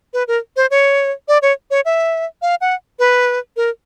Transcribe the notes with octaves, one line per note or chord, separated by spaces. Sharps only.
B4
A#4
C5
C#5
D5
C#5
C#5
E5
F5
F#5
B4
A#4